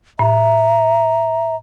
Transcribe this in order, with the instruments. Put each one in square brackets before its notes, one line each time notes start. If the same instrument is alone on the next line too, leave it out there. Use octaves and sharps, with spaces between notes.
[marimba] A2 [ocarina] E5 [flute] A#5